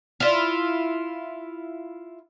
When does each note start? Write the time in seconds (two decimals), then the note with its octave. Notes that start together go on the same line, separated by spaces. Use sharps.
0.20 E4 F4